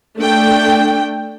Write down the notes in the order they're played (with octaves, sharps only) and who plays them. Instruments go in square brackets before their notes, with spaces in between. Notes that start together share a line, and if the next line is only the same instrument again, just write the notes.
[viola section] A3 D4 G5